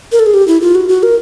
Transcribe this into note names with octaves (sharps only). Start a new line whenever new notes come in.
A#4
A4
G#4
G4
E4
F4
F#4
F#4
A#4